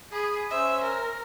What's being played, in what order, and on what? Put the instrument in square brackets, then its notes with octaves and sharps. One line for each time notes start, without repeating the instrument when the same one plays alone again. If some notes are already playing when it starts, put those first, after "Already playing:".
[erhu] G#4 [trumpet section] B5 D#6
[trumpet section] C#4 C5 [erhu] E5
[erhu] A#4